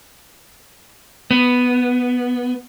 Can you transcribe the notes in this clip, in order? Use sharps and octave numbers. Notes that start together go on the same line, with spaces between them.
B3